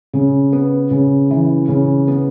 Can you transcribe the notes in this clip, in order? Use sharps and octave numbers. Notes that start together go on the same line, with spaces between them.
C#3
B3
C#3
E3
C#3
B3